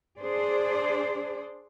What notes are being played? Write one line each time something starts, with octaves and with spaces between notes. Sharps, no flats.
D4 G#4 C5 D5